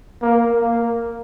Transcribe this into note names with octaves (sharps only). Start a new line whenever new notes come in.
A#3
A#3